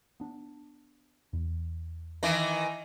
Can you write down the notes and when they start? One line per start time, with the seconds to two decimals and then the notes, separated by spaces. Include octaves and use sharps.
0.20 B3 D4
1.33 E2
2.23 D#3 E3